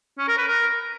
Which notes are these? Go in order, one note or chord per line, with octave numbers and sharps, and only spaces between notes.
C#4
A#4
B4
A#4